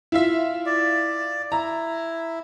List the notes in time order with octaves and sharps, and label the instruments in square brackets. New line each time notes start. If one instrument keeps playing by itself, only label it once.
[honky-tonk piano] E4 F4 E5
[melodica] D5
[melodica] E4 [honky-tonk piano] A#5